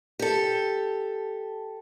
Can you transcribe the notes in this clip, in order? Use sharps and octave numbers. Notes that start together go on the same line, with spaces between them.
G4 A4